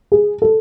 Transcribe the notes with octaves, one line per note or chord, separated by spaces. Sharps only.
G#4
A4